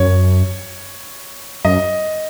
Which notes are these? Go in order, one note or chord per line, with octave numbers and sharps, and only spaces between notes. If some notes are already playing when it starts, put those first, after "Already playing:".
Already playing: F#2 C#5
F#2 D#5